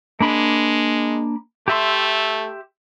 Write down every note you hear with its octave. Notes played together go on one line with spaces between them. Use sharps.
G#3 A#3 D4 B5
A3 G4 E5 C6